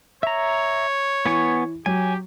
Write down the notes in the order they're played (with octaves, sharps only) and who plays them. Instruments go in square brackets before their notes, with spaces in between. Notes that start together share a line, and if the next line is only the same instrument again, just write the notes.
[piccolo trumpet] C#5 [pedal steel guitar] E5 A#5
[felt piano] E3 [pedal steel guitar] B3 G#5 C#6
[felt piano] F#3 [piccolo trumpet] G4 [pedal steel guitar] G#5